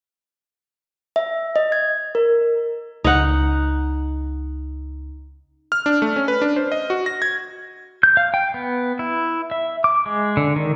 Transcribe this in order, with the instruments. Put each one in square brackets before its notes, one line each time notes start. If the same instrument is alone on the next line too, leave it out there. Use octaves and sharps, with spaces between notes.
[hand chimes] E5
D#5
G#6
A#4
[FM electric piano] C#2 [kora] D#4 F#5
[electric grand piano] F6
D4
A3
C#4
B4
D4
C5
D#5
F#4
A#6
G#6
[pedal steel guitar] G6
F5
G5
B3
E4
E5
D6
G#3
D3
D#3